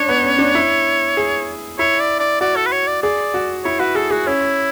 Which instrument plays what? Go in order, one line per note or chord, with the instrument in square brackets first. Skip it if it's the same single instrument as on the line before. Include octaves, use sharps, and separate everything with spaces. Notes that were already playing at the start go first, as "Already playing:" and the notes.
Already playing: [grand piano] C#4 D4 [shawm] C#5
[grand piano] B3
C#4
D4
E4
G#4
[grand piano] E4 [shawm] C#5
[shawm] D5
D5
[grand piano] F#4 [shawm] D5
[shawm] A4
B4
C#5
D5
[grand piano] G#4 [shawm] D5
[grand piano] F#4
[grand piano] E4 [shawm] C#5
[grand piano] F#4 [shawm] B4
[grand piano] G#4 [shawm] A4
[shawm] F#4 [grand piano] G#4
[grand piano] C#4 [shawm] E4